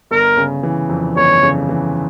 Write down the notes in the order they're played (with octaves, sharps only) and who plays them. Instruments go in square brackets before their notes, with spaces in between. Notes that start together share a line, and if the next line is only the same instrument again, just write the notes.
[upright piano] G1 [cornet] A#4
[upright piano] C#3
E3
F2
[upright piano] G1 [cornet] C#5
[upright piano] C#3
E3